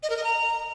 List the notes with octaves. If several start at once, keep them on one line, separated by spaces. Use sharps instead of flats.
D#5
A#4
D#5
A#5